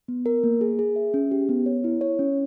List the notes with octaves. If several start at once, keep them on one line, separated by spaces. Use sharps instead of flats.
B3
A#4
A#3
G#4
G#4
E5
C#4
G4
B3
C#5
E4
C#5
C#4